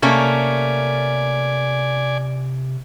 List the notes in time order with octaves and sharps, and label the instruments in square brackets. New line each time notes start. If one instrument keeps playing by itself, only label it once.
[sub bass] C3 [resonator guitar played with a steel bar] A3 A#3 C#4 [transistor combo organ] D5 G#5